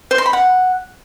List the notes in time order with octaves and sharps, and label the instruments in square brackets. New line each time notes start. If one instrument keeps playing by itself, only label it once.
[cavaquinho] C5
C6
B5
F#5